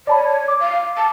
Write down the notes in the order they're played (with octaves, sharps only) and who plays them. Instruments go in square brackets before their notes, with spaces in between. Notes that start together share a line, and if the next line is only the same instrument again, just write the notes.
[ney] C#5 [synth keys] D5 A5 B5
[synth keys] D6
[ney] F5
A5